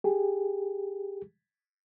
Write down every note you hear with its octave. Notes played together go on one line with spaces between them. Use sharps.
G4 G#4